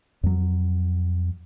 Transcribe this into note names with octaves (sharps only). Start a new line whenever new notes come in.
F2 F#3